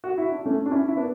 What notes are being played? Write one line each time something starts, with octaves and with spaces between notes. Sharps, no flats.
F#4
E4
D4
A3 C#4
D4
C#4 E4
E4
B3 D4